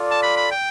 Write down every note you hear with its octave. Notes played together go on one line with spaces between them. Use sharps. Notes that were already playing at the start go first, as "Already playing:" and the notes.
Already playing: F4 A4 D5
A5
B5
B5
G5